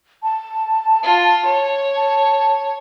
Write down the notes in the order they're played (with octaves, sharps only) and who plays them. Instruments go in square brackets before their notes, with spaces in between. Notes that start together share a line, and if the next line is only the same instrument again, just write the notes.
[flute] A5
[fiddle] F4
C#5
[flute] A5